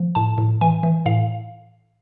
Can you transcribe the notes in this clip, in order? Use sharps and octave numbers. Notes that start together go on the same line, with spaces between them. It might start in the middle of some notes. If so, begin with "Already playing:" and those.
Already playing: F3
A2 A5
A2
E3 G#5
E3
A2 F5